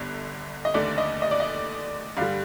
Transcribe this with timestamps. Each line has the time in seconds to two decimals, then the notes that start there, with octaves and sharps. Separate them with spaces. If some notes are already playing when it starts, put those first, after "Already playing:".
Already playing: G1 G2 D3
0.65 D#5
0.74 F1 D#2 D3 A3 D5
0.98 D#5
1.22 D#5
1.31 D5
1.40 D#5
2.17 G2 D3 G3 F5